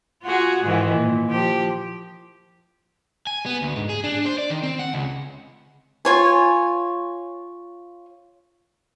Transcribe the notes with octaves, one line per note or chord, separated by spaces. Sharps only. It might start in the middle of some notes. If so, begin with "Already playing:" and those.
F4 F#4 G#4
G#2 D#3 E3
A#2
F3 G4
G#5
B3
D2
G#2
G#4
D4
C5
D5
D#3
C4
F#5
C#2
F4 C#5 G#5